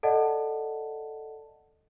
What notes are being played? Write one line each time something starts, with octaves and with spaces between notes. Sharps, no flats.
A4 D5 D#5 F#5 A5